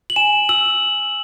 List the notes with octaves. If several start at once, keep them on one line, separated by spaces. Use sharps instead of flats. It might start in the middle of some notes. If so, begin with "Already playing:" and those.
F#7
G#5 E7
E6 F#7